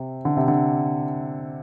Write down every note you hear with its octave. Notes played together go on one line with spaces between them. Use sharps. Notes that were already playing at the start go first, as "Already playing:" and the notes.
Already playing: C3
D3
C3
D3